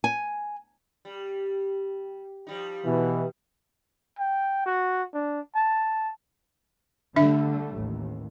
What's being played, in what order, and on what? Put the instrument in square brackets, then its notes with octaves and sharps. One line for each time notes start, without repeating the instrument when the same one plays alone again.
[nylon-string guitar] G#5
[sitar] G3
F3 G3 D#4
[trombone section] B2 E3
[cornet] G5
F#4
D4
A5
[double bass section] D3 G3 A3 [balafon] D4 E5
[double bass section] A1 D#2